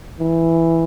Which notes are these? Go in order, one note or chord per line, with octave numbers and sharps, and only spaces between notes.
E3